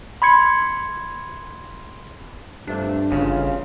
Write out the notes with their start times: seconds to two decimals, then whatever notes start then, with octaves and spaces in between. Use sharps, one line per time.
0.22 B5 C6 G#6 C#7
2.67 G2 C3 F3 A3 D4
3.12 G1 D2 C#3 E3 F4